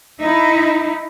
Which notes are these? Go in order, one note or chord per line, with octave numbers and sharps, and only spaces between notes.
D#4 E4